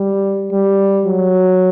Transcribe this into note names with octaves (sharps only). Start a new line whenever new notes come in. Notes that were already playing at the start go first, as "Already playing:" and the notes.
Already playing: G3
G3
F#3